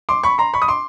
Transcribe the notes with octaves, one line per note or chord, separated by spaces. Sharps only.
C6 D6
B5 C#6
A#5 C6
B5 C#6
D#6
C6 D6